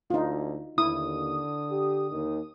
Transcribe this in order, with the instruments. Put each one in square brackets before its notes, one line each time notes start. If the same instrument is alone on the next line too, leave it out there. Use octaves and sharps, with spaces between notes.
[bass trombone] D2 [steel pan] D#4 F4
[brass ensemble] D#2 [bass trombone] D3 [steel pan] E4 [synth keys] D#6
[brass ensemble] G4
D#2 D#3